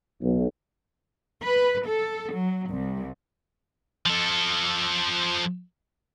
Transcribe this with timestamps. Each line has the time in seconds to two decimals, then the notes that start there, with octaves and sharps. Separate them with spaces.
0.21 B1
1.43 B4
1.88 A4
2.34 F#3
2.70 C2
4.06 F3 A4